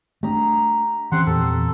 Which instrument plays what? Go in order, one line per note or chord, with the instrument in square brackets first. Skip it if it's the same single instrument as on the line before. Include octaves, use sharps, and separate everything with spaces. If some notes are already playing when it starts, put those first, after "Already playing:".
[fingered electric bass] A3 B3 D4 [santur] G4 D#5 A#5
[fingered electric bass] E3 C#4 [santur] C4 G4 [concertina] F#5 C6
[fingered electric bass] E2 A#2 E3 [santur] G4 F#5 [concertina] A4